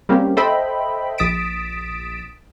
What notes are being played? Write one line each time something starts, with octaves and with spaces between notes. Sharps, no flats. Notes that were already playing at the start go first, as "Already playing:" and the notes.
G3 A#3 C4 C#4 G4
A4 C5 D#5 E5 G5 B5
A#1 D#6 A6 B6 D7 E7